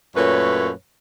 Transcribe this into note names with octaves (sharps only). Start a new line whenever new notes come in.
F#2 A#2 A3 B4 C#5